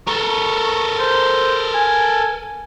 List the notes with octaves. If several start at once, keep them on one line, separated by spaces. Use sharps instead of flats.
A4 A#4 C#6
C5
G#5